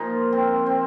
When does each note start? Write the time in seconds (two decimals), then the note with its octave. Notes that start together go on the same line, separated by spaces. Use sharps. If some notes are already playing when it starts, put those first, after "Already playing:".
Already playing: A#2 F3 D#4 F4
0.33 C4
0.66 C4